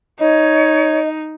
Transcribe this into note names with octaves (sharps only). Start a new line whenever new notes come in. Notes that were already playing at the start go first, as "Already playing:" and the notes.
D#4 C#5 D#5